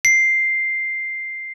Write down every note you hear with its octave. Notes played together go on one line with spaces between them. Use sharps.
C7